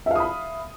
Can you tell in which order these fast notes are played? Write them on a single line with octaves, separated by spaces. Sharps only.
E5 F5 D#6 B5